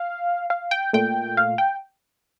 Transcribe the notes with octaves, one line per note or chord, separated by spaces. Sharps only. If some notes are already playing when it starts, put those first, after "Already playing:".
Already playing: F5
F5
G5
A#2 A3 G5
F5
G5